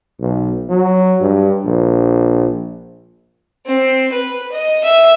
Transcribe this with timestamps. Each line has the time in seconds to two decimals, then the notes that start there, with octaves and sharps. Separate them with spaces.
0.20 B1
0.69 F#3
1.21 G2
1.65 A#1
3.66 C4
4.12 B4
4.52 D#5
4.84 E5